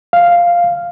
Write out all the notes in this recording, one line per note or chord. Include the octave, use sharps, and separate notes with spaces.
F5